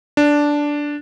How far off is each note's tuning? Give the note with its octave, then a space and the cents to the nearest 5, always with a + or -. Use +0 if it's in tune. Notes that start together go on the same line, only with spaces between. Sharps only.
D4 -5